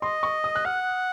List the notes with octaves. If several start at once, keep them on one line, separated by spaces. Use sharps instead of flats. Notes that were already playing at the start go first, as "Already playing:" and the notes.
D#5 C6
C#6
D#6
F#6
F#5 F6